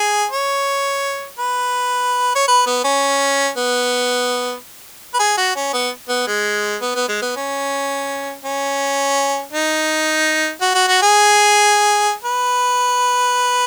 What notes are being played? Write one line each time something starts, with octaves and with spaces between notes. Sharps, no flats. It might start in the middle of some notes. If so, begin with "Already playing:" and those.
Already playing: G#4
C#5
B4
C#5
B4
B3
C#4
B3
B4
G#4
F#4
C#4
B3
B3
G#3
B3
B3
G#3
B3
C#4
C#4
D#4
F#4
F#4
F#4
G#4
B4